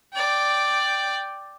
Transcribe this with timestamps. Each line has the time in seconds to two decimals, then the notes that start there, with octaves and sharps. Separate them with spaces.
0.13 D5 G5